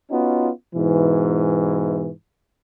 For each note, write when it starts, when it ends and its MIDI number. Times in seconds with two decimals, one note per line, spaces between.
0.10 0.49 59
0.10 0.49 61
0.10 0.49 63
0.10 0.49 65
0.10 0.49 66
0.74 2.10 44
0.74 2.10 47
0.74 2.10 52